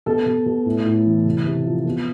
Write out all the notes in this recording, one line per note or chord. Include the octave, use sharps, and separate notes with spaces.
B2 A4
B2
B2
A2
A2
E3
C3
C3
F3
B2